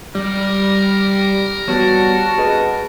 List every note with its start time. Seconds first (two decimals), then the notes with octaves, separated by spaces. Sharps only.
0.15 G3 A#4
1.68 G3 B3 F#4 C#5 A5
2.38 G#4 B4 D#5